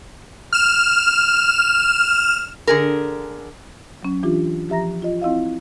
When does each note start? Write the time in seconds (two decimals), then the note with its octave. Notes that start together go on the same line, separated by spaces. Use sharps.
0.53 F6 E7
2.67 D3 G#4 A#4
4.03 F#3 C#4
4.23 E3 D4 F4 G4
4.69 F3 G4 E5 A#5 A#6
5.02 F4 D#5
5.22 C4 E4 D#5 F5